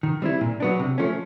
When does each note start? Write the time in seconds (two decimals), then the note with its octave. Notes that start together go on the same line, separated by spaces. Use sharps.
0.03 D#3
0.22 G3 C4 E4
0.41 A#2
0.60 F#3 B3 D4
0.79 C3
0.98 F3 A3 C#4